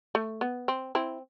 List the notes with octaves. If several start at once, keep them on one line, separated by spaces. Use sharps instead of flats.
A3
B3
C4
C4 E4